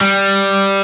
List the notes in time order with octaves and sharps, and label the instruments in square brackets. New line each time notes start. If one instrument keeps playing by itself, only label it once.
[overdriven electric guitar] G3